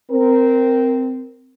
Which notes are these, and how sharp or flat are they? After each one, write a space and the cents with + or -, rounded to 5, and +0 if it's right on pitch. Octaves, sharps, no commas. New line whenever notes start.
C4 -10 A#4 +0